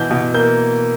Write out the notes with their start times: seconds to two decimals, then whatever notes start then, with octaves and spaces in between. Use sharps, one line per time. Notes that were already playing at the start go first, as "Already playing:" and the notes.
Already playing: B2 E3 G6
0.11 B2
0.34 A#3 G6